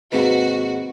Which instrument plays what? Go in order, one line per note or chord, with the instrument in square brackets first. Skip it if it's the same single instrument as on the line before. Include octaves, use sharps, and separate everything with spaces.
[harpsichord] D#2 G#2 C3 [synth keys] C4 B4 [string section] F#4